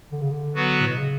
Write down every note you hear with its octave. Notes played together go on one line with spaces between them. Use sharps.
D3
C#3
D3
F#3 B3 F#4 B4
A2
B2
C#3